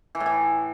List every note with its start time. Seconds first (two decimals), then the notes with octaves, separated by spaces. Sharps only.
0.15 E3
0.20 A2
0.26 E3